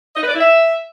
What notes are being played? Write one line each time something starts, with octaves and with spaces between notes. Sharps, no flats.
D#5
B4
D5
E4
E5